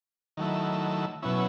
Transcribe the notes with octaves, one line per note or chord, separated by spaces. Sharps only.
D#3 F#3 A3 E4
B2 F#3 C#4 E4